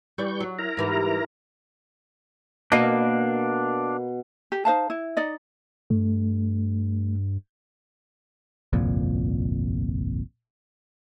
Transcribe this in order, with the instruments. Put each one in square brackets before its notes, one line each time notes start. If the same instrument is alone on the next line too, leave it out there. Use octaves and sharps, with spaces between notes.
[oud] E3 D5 [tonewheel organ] G3 C#6 G6
[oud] F#3
[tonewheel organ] E4 A#4 A#5
[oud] G#2 E3 G3
[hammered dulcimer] B2 [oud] A#3 D#5 [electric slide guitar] D4 F5
[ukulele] G4
D#4 C5 F5 A5
E4
D#4 D5 D#5
[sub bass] G2 [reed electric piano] A3
[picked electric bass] G1 C2 F2 A#2